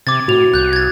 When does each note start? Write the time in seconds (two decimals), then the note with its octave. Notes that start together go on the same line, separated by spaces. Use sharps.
0.07 C3 D6 G#6 A6
0.28 A2 F#4 F7
0.54 C2 F#6 G6
0.73 G#6 A6